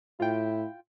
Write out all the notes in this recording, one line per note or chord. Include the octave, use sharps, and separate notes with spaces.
A2 E4 F4 G5